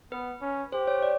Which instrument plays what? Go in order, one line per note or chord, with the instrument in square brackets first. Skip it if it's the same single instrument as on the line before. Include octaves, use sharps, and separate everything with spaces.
[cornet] B3 [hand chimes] B4
[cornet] C#4
[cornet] G4 [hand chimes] C5
[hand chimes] C#5
D5